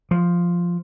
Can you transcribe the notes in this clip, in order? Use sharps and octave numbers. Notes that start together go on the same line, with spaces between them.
F3